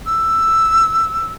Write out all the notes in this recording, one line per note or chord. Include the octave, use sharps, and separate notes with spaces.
E6